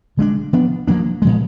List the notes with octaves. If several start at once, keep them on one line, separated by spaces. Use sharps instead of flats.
D3 G#3 B3 D4
F3 B3 D4
F3 A#3 D4
A#2 F3 G#3